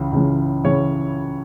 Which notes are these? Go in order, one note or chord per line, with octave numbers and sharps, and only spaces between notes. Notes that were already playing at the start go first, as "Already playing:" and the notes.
Already playing: C#2 C#3 E3
C#2 C#3 E3
C#3 E3 C#5